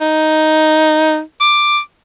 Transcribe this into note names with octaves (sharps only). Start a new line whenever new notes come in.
D#4
D6